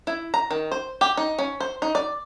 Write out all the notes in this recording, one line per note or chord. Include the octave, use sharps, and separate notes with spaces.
E4
A#5
D#3
C5
G4
D#4
C#4
C5
D#4
D5